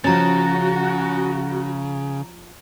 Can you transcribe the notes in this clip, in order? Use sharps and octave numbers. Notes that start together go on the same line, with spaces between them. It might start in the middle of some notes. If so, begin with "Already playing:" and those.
C#3 F3 C#4 F#4 A#5 A6